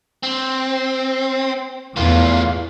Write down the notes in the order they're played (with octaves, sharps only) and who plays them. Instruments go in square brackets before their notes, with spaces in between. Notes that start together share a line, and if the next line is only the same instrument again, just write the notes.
[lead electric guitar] C4
[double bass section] E2 [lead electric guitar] A2 F4